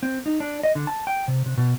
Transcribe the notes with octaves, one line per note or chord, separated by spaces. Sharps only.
C4
D#4
D4
D#5
D3
A5
G5
C3
C3
B2